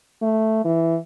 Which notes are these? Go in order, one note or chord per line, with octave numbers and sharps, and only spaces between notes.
A3
E3